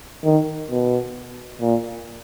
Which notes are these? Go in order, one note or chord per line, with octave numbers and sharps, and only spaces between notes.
D#3
B2
A#2